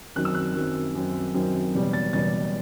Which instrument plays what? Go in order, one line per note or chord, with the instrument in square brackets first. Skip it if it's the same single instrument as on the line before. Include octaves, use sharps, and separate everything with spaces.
[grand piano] F#2 D#3 F#3 C4 F#6
E6
F#6
F#2 D#3 F#3 C4
F#2 D#3 F#3 C4
F#2 D#3 F#3 C4
F#1 E2 B2 G3
A6
F#1 E2 B2 G3 A6